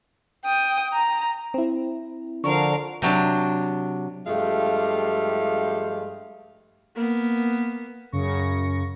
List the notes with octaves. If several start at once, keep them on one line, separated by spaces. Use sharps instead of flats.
G5 D#6
A#5
C4 E4
D3 F3 A#4 F5 C#6
C3 F#3 D4
G2 F3 G#3 A3 G4 F5
A#3 B3
F#2 C#3 C#6 A#6